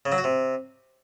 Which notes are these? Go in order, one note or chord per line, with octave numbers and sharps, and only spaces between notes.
C#3
F#3
F#4
C3